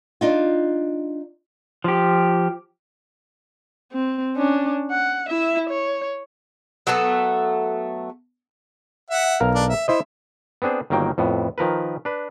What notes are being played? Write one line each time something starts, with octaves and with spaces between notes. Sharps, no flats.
D4 D#4 F4
F3 G4
C4
C#4 D4
F#5
E4 E5
C#5
F#3 A3 B3 A4
E5 F#5
B1 A#4 F5
D4
E5
E4 C5 D#5 E5
B3 C4 D4 G#4 C5
G1 D#3 F#3 A#3 G5
F2 A2 B3
D#3 F3 A#4 B4
D4 B4